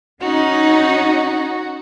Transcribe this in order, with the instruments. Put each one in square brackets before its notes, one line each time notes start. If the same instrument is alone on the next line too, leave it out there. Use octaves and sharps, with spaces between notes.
[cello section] C#4 D#4 [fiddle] F#4